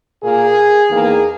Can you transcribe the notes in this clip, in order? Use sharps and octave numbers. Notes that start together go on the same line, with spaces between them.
A#2 A#3 G#4
E2 D#3 A#3 G#4